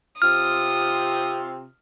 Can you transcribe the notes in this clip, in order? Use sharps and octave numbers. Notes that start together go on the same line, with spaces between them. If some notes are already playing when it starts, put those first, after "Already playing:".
C3 C4 F4 D#6 F6